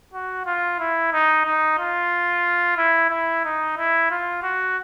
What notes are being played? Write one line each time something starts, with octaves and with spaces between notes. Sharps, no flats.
F#4
F4
E4
D#4
D#4
F4
E4
E4
D#4
E4
F4
F#4